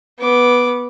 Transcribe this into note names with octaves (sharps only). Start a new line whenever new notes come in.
B3 D6